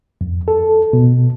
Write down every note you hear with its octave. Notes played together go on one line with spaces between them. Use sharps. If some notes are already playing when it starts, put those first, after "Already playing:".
F2
A4
B2